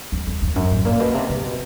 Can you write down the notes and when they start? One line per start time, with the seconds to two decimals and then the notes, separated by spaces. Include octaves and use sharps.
0.12 F2
0.27 F2
0.42 F2
0.56 F#2
0.71 A2
0.85 A#2
1.00 B2
1.14 C3
1.30 C3
1.44 B2